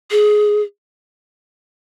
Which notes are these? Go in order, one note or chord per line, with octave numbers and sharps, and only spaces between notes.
G#4